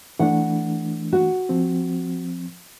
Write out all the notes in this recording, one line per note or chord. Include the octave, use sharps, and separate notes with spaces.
E3 A3 D4 F#5
F#4
F3 C4